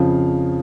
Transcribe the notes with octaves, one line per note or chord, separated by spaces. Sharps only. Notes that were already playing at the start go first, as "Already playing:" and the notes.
Already playing: F2 C#3 F3 F5